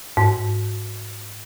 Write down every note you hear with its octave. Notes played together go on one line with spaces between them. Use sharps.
G#2